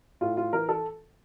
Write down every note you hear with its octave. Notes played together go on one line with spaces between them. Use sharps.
A2 F4
F4
E3 A#4
A4